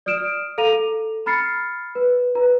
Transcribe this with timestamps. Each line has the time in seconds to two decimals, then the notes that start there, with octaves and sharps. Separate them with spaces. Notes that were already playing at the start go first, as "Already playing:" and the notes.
0.06 D5 D#6 F6 D7 E7
0.58 A4 F5 A#5 D#7 F7
0.73 A4
1.26 A#5 B5 F6 A6 C7 C#7
1.95 B4
2.35 B4 A#5